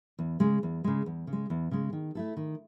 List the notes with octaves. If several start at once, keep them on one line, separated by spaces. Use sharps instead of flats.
E2
C#3 G#3
E2
C#3 G#3
E2
C#3
G#3
E2
C#3 G#3
D#3
A3 E4 A4
D#3